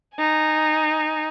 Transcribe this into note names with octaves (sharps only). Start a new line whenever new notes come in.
D#4 G#5